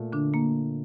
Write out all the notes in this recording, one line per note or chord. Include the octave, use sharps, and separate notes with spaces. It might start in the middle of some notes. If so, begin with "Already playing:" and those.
Already playing: A#2 A3
D3 D4
A#3